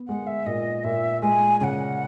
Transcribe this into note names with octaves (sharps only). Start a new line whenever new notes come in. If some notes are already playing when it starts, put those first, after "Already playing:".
Already playing: B3
G#3 F#5
E5
A#2 D#5
A#2 E5
G#3 G#5
C#3 F#5 G#5